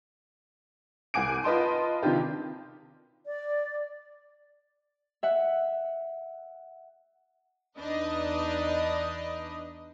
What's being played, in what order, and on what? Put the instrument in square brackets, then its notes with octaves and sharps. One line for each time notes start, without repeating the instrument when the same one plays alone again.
[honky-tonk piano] C2 F#5 G#5 D6 D7
F4 B4 D#5 A5 C6
C3 D#3 D4 F4 G4
[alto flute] D5
[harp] E5 F#5
[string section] E2 D4 D#4 B4 D#5